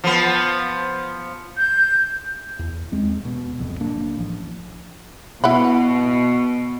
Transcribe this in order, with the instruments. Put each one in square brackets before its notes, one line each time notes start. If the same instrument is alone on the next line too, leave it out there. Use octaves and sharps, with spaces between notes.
[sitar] F3 B3
[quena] G6
[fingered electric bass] E2
D#2 G#3 C4
E1 B2
D1 C2 F2
D1 A#3 D4
A1 F3
[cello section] B2 [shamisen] E4 F#5 B5